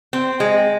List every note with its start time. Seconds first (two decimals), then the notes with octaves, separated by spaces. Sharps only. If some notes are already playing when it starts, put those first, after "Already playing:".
0.13 C4
0.40 G#3